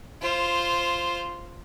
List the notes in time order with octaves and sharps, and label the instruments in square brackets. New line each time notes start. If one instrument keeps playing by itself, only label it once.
[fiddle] F4 C5